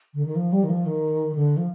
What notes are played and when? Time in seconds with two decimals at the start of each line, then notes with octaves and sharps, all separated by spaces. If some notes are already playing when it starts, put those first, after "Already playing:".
0.14 D3
0.25 D#3
0.35 F3
0.52 G3
0.63 D#3
0.69 F3
0.85 D#3
1.35 D3
1.57 F3